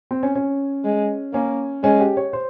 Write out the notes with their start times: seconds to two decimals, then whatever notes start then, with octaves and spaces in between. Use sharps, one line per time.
0.11 C4
0.23 C#4
0.35 C#4
0.85 G#3
1.34 A#3 C#4
1.84 G#3 C#4
2.00 G4
2.17 C#5
2.33 C5